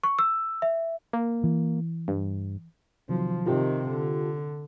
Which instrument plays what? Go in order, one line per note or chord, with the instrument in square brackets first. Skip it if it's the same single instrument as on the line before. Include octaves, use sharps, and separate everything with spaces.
[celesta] C#6
E6
E5
[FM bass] A#3
[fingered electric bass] E3
[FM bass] G2
[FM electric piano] C3 D#3 F#3 [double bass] F3
[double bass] C3 D#3 [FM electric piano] F4 G4
[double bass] D3